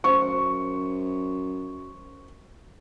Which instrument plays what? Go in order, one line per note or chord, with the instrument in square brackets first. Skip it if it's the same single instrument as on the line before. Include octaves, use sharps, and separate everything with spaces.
[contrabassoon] F#2 [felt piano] C5 C#6